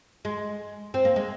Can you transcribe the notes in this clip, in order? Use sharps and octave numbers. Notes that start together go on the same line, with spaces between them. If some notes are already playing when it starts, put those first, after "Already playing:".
G#3
C4
A#3
G#3